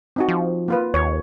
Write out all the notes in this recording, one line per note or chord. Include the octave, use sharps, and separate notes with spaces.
C4 D#4 F#4
F3
A#3 F4 B4
D#2 C#5